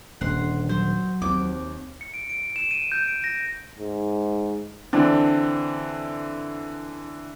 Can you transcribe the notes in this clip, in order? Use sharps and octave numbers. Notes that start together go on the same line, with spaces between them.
D#1 D3 F#5 C6
F#3 C5
D#2 C4 D6
C#7
D7
D7
E7
D#7
G6
D7
A#6
G#2
D3 E3 C4 D4